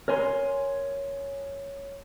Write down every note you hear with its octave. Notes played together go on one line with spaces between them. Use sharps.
A#4 C#5 G#5 C6